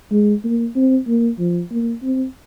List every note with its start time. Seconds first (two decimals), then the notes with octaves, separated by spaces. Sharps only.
0.12 G#3
0.44 A#3
0.76 C4
1.07 A#3
1.39 F3
1.71 A#3
2.03 C4